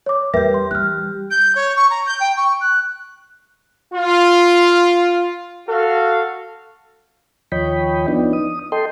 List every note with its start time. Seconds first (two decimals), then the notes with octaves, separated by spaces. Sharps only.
0.06 C#5 D6
0.34 E2 G3 G4 A#4 B4 E5
0.54 C6
0.71 E3 F6 F#6
1.31 G6
1.55 C#5
1.76 C#6
1.90 A#5
2.06 G6
2.20 G5
2.37 C#6
2.61 F#6
3.94 F4
5.68 F#4 A4 F5
7.52 D#2 F3 C#5 D#5 G5 B5
8.08 F3 B3 D4 D#4
8.33 D#6
8.72 A4 D#5 G5 C6